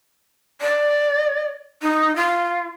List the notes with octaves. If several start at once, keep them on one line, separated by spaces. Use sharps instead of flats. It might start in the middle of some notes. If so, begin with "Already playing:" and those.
D5
D#4
F4